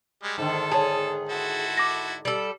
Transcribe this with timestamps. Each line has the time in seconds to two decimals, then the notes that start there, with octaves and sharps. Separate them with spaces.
0.23 G3 G#3
0.38 G#2 D3 D#3 A4
0.72 G#4 C#5 A5
1.29 E4 F#4 A4
1.77 D6 A#6
2.25 G3 A4